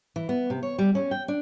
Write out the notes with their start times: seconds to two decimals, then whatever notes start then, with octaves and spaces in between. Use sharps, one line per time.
0.16 E3
0.29 B3
0.50 C3
0.63 C#5
0.78 G3
0.95 C#4
1.11 G5
1.28 D4